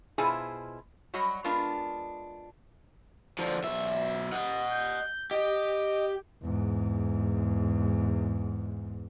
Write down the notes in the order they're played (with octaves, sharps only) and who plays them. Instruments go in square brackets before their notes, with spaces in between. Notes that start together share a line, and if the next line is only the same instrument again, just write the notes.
[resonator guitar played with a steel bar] B2 E4 F4 G#4 C5 G#5
F#3 G3 F#4 C#5 D#5
G#3 B3 D4 F4 A#4
[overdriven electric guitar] D3 F3
B1 E5
D#5 F#5
[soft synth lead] G6
[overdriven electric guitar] G4 [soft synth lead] D#5
[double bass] E2 G#2